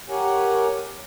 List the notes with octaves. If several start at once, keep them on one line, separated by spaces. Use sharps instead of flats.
G4 A#4 C#5 F#5 G#5